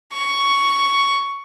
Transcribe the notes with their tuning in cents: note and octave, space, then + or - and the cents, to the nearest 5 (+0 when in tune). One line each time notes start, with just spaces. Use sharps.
C#6 +10